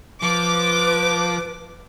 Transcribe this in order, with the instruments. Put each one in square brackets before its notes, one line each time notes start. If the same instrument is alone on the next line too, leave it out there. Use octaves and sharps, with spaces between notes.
[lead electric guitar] F3 [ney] B4 [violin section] D6